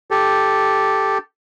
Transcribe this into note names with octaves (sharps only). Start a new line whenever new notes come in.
G4 A4